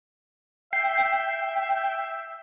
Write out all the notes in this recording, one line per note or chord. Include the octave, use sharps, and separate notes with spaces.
E5 G5 C7